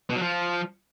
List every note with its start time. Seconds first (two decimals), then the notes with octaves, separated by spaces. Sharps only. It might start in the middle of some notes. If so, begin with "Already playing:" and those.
0.10 B2
0.16 F#3
0.22 F3